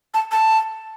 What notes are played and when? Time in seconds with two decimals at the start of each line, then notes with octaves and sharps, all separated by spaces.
0.14 A5
0.32 A5